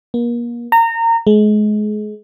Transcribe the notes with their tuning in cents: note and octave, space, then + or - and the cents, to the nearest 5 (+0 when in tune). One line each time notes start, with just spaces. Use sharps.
A#3 +35
A#5 -25
G#3 +30